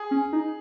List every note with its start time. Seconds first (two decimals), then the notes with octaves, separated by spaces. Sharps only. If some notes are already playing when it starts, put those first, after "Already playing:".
Already playing: G#4
0.11 C#4
0.33 D#4